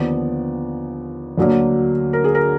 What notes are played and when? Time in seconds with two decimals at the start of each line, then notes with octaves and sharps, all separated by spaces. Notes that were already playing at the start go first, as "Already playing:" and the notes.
Already playing: D#2 D3 F3 B3 D5
1.37 D2 D3 F#3 A#3
2.13 A#4
2.24 G#4
2.35 A#4